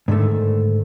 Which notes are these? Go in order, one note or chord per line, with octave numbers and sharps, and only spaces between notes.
G#2 D3 D#3 A3